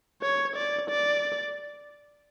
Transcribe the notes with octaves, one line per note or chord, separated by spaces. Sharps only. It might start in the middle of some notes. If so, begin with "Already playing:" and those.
C#5
D5
D5